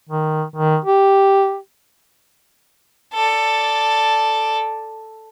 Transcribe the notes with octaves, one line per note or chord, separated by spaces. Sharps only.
D#3
D#3
G4
A4 D5